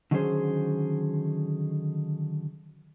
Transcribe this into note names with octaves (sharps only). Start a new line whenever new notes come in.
D3 D#3 F#3 C#4 G#4 C5